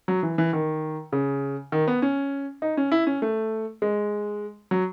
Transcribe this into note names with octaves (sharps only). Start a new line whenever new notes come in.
F#3
E3
E3
D#3
C#3
D#3
B3
C#4
D#4
C#4
E4
C#4
A3
G#3
F#3